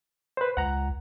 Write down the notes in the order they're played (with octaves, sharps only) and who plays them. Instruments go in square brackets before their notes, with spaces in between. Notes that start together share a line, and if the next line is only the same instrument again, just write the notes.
[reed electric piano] B4 C5
[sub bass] C#2 [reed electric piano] F#5 A#5